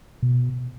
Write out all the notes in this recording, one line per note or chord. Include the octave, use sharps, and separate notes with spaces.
B2